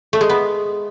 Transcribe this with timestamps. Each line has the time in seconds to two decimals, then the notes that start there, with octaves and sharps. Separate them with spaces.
0.13 A3
0.21 G#3
0.29 B3